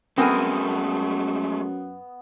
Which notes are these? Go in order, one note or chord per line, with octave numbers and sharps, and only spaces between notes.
F#2 G#3 A3 B3 C4 A#4 G#5 D#6